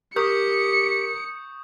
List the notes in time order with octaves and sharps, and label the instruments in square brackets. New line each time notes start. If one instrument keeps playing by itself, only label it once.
[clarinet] G4 [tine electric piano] A#4 [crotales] C#6 D#6 G6 [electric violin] C#7